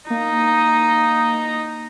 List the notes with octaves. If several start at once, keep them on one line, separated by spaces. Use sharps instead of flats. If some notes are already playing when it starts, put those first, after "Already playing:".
A#3 D#4